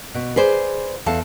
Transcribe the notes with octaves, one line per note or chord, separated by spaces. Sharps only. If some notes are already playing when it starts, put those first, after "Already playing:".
B2
G#4 B4 C5 D5
E2 A4 F5 A5